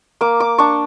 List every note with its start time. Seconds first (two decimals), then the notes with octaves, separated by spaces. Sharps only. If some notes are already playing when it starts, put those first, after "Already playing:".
0.21 A#3 D6
0.40 D6
0.58 D4 C#6